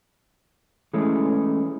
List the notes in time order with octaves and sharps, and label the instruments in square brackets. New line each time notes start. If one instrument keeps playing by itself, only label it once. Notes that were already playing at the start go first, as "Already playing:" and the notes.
[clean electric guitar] E3 G#3 A3 C#4